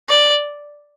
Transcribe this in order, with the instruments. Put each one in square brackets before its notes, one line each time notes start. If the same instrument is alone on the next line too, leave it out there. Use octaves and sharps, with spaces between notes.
[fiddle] D5